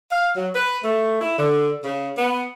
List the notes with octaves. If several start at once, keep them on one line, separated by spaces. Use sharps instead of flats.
F5
F#3
B4
A3
E4
D3
C#3
B3